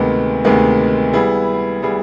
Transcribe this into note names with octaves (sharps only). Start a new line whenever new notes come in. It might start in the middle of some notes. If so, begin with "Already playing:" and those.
Already playing: D2 C3 D#3 G#3 B3
D2 C3 D#3 G#3 B3
G3 B3 E4 G#4
G3 B3 E4 G#4